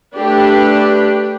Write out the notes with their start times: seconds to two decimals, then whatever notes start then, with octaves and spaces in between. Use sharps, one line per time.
0.16 A3 D4 G4 B4